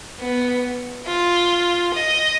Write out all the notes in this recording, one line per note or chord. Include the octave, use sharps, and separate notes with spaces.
B3
F4
D#5